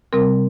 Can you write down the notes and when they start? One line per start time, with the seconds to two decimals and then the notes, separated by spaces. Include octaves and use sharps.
0.13 C3 G3 C4 A#4